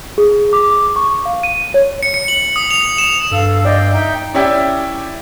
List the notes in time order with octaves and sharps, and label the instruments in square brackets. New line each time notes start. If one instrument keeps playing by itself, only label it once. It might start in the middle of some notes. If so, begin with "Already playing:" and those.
[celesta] G#4
D6
C#6
F5
D#7
C#5
[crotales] C#7
C#7
F#7
D#6
F7
E7
[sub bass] G2 [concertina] A4 [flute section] F5 E6
[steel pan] D5 D#5 [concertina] G5
[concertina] D#4 G5 [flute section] E5
[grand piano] C#4 E4 G4 D5 E5 G5